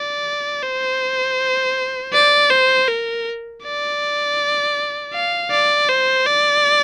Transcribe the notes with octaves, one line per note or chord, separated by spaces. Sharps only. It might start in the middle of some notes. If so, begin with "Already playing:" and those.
Already playing: D5
C5
D5
C5
A#4
D5
F5
D5
C5
D5